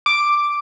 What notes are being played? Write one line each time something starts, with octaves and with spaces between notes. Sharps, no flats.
D6